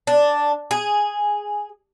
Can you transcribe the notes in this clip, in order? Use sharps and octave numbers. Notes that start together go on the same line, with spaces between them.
D4
G#4